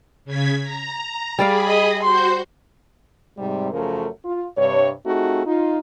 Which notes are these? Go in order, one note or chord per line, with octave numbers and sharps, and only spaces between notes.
C#3 G#6 B6
A#5
G3 G#4 D5 F5 B5
D#5
F#4 C5 C6 G6
G#2 C3 G3
F#2 C#3 F3 A3 A#4
F4
G2 C3 C#5
A3 C4 D#4 F4 F#4 G#4
D#4 F4